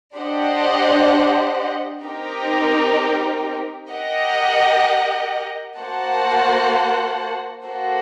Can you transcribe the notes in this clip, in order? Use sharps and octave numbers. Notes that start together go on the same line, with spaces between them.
D4 G4 C5 D#5 F#5
C4 D#4 G4 A#4
G4 A#4 D#5 F#5
A#3 F#4 C5 F#5 A5
A#3 F#4 A4 C5